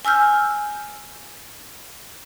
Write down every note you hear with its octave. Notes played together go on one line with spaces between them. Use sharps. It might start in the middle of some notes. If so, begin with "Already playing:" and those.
G#5 E6 F6 G6